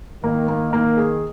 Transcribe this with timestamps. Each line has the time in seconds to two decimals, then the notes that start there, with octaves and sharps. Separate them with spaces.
0.24 D#3 A#3
0.48 A#3
0.73 D#3 A#3
0.97 G#4